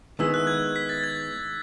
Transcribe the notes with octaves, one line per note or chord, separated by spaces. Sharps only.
D#3 G#3 B3 E4 G#4 E6
F#6
G#6
B6
A6
G#6